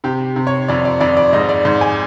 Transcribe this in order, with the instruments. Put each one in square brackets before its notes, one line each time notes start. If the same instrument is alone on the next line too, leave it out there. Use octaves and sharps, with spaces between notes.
[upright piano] C3 G4
C3
C#5
F2 D5
D5
F2 D5
D5
G#2 D#5
D5
G#2
G#5